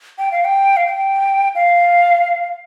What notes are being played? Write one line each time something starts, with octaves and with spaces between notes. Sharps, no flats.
G5
F5
G5
F5
G5
F5